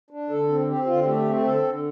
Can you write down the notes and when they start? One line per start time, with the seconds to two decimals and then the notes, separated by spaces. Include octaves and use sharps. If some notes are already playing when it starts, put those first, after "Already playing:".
0.10 D4
0.30 D3 A4
0.48 C4
0.67 C4 G4
0.87 D3 F4
1.05 A3 G4
1.24 C4
1.43 D3 A4
1.63 D3